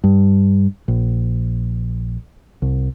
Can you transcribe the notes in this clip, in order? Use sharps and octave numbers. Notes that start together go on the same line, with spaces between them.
G2
A#1
C2